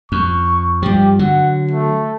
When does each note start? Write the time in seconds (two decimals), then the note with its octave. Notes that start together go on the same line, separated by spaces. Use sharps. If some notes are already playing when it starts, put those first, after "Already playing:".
0.12 F2 C#6
0.83 G2 F3 G4
1.19 D3 F#3 F#5
1.71 A3